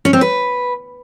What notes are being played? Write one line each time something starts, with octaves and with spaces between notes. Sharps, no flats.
C#4
C4
B4